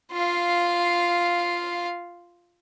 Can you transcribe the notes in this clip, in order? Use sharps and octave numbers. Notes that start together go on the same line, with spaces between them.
F4 F5